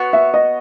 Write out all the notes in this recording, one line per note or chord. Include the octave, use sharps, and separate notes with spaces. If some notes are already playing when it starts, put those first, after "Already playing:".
Already playing: B3 F#4 C#5
E5
D#5